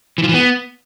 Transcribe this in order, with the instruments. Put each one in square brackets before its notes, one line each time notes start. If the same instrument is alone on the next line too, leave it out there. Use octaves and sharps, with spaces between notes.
[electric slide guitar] E3
F3
E3
B3